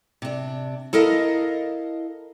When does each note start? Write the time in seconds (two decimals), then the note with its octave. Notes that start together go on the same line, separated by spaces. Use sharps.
0.22 C3 D4
0.93 E4 A4 A#4 D#5 F5